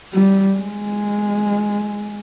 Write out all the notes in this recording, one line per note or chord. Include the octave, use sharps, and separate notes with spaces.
G3
G#3